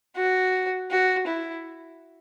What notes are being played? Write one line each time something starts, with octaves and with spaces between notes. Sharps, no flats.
F#4
F#4
E4